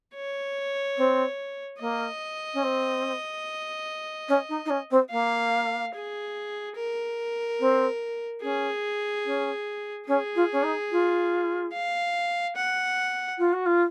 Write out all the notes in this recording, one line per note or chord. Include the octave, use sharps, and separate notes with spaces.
C#5
C4
A#3 D#5
C#4
C4
C#4
D#4
D#4
C#4
C4
A#3 F5
G#4
A#4
C4
C#4 G#4
C#4
C#4 G#4
F4
C#4
D#4
F4
F5
F#5
F4
F#4
F4